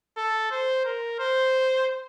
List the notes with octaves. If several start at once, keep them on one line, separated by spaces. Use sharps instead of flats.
A4
C5
A#4
C5